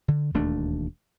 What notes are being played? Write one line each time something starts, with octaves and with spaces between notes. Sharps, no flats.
D3
E1 D#2 A3 D4